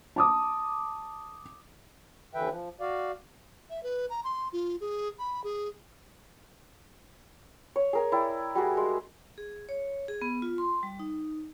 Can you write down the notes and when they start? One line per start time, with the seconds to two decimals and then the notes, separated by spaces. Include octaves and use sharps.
0.16 A5 D6 D#6
2.34 D#2 D3 E3 B4 E5 G5
2.50 F3
2.80 F#4 D5 F5
3.70 E5
3.83 B4
4.10 A#5
4.24 C6
4.53 F4
4.81 G#4
5.19 B5
5.44 G#4
7.76 C#5
7.93 G#4 A#4 G#5
8.12 E4 D5 G5
8.55 G3 F#4 G#4
8.77 G#3
9.38 G#4
9.69 C#5
10.08 G#4
10.22 B3
10.42 F4
10.58 C6
10.83 G3
10.99 D#4